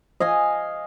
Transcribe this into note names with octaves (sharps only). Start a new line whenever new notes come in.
D#5 F5 G#5